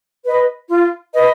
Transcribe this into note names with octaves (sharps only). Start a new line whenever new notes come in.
B4 D#5
F4
B4 D#5